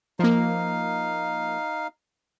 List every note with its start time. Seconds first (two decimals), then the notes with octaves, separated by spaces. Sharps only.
0.19 F3 A#3 D#4 F5